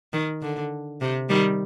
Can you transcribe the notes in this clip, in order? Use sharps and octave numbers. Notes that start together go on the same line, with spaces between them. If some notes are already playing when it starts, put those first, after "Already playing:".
D#3
D3
C3
D#3 G3